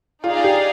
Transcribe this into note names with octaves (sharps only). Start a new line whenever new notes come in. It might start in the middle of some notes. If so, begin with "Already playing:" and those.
D#4 F4 G#4 D5 F5
G4